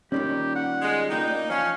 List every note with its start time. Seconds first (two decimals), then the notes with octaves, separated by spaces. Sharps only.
0.12 A#2 D#3 G3 C#4 G4
0.56 F#5
0.82 G#3
1.10 C#2 A#3 D#4 F4 G5
1.28 A#3 D5
1.50 F3 C#4 F5